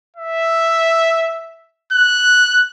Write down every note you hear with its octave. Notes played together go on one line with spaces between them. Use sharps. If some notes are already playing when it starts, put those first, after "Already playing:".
E5
F#6